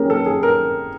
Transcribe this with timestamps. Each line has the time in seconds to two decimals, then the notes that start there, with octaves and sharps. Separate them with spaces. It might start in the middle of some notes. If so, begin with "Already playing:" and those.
Already playing: A#3 C#4 G4 G#4 A#4
0.10 A4
0.26 G#4
0.43 A#4